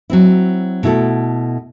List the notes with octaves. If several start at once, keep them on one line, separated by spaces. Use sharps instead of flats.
F#3 C4 E4
B2 A3 E4 A4